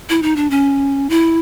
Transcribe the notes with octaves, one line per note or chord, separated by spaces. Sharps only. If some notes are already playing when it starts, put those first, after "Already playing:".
E4
D#4
D4
C#4
E4